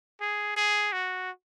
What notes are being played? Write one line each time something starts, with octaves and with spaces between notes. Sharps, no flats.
G#4
G#4
F#4